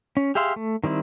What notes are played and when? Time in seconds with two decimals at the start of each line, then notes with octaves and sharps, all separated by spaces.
0.17 C#4
0.35 G4 G#4 E5 F5 C6
0.56 A3
0.84 D#3 G3 C4 E4